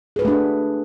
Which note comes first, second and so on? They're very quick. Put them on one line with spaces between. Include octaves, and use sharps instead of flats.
G#4 B4 F#4 A3 D4